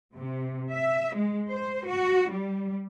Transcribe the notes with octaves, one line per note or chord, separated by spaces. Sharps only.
C3
E5
G#3
C5
F#4
G3